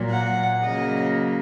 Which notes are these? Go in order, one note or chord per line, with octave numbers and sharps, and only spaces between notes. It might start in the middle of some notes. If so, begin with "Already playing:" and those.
Already playing: A#2 F#3 A#3
F#5
C#3 F#3 A#3 D#5